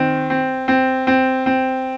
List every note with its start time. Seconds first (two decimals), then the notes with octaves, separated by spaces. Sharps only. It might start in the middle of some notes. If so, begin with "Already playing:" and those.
Already playing: D#3 C4
0.30 C4
0.68 C4
1.07 C4
1.46 C4